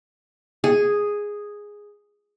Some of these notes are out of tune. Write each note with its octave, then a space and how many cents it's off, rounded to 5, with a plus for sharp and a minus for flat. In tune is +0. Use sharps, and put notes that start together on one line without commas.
G#4 -5